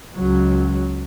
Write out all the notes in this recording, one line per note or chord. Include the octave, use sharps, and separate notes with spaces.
C#2 F#3